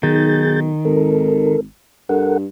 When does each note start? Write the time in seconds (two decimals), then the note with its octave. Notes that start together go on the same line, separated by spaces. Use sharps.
0.03 B1 D#3 G#4 G6 A6
0.85 G#1 A4 A#4
2.09 G2 A4 A#4 F#5